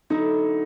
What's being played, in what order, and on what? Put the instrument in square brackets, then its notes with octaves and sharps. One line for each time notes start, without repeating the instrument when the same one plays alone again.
[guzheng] D3 F#3 B3 E4 [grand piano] D#4